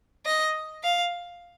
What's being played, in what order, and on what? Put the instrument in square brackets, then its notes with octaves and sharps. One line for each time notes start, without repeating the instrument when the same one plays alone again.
[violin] D#5
F5